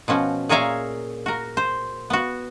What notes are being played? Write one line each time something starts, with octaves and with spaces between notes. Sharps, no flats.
B2 F3 C#4 F#4
A#2 G#4 A#4 C#5 E5 F5
F#4 A#4
C5
B3 F#4